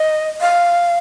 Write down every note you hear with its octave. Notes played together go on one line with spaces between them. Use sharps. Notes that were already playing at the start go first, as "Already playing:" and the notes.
Already playing: D#5
F5